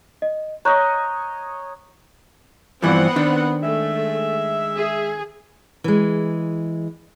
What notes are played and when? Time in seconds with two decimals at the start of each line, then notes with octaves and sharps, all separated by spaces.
0.22 D#5
0.65 C#5 D#5 A#5 F#6 G6
2.82 G2 E3 F3 B3 C4 F#5
3.16 D#3 D4
3.63 G#3 A3 E5
4.76 G#4
5.84 E3 G#3